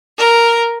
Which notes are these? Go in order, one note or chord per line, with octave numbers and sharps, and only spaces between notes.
A#4